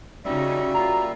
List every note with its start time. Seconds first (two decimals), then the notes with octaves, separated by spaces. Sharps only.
0.25 C#3 G3 C#4 D#4 F#4 E5
0.74 A#3 F4 A#5